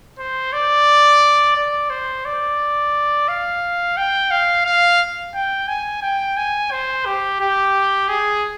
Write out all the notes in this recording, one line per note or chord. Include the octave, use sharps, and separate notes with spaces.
C5
D5
D5
C5
D5
F5
G5
F5
F5
G5
G#5
G5
G#5
C5
G4
G4
G#4